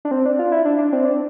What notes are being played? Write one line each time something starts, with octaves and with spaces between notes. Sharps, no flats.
D4
C4
D4
F4
E4
D4
D4
C4
D4